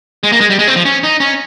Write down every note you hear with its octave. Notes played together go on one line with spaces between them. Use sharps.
G#3
A#3
G#3
G3
G#3
C4
F3
C#4
D#4
C#4